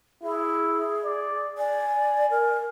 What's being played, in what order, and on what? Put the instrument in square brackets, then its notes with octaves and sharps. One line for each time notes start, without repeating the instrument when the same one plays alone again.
[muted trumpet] E4 [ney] G#4
[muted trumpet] D5
[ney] D5 [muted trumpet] G#5
[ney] A#4